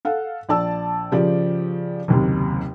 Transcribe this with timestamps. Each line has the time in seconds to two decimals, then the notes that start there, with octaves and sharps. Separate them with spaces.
0.05 A4 F5 F#5
0.49 A#1 D5 A5 E6
1.12 C#3 F3 G4 D5
2.08 F#1 D#2 C3